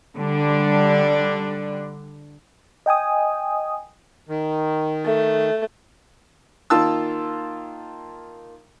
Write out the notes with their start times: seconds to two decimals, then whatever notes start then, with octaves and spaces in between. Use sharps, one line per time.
0.16 D3 G3 D4
2.86 D#5 G5 G#5 D#6
4.29 D#3
5.05 A3
6.70 D#3 A#3 F4 A5 E6